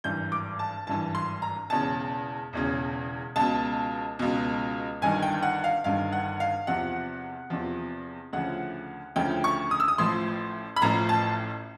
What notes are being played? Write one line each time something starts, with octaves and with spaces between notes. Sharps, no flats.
G#1 G2 E3 G6
D6
A5
G#1 G2 E3 A5
C6
A#5
E1 E2 C#3 A5
E1 E2 C#3
C#2 B2 A5
C#2 B2
G1 G2 D#3 G#5
G5
F#5
F5
G1 G2 D#3 F5
F#5
F5
E2 C3 F3 F#5
E2 C3 F3
D2 C#3 F3 F#5
D2 C#3 F3 G5
C#6
D#6
E6
D#6
A1 A2 F3 C6
B5
A1 A2 F3 A#5
A5